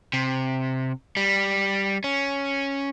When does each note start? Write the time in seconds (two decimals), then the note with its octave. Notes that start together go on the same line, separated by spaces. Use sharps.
0.13 C3
1.17 G3
2.04 C#4